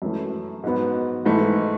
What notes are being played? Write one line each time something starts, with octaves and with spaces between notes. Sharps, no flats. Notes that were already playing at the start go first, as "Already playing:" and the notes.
F#2 E3 A3
G#2 F#3 B3
G#2 E3 A3 E4